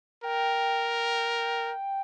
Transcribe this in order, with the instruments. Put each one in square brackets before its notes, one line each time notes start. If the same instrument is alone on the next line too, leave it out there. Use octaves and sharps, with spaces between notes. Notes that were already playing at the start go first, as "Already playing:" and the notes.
[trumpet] A#4 [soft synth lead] G5